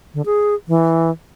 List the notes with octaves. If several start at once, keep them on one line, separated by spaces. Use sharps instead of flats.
D3
G#4
E3